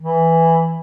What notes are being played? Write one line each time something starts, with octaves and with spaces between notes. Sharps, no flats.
E3